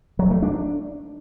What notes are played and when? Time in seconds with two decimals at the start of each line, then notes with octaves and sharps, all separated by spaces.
0.19 F#3
0.31 A3
0.42 D4